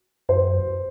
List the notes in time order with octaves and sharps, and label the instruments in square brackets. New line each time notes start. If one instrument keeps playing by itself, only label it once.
[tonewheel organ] F#2 [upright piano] C5